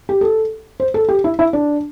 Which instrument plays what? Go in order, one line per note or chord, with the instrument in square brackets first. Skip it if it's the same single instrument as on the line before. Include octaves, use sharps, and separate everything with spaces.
[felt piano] G4
A4
C5
A4
G4
E4
E4
D4